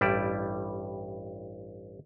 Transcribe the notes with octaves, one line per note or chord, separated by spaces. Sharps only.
A1 G2 G3 E4 D5